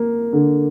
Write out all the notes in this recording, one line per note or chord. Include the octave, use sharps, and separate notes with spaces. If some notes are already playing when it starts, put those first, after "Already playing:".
Already playing: A#3
D3